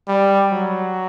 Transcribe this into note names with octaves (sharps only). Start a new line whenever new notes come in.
G3
F#3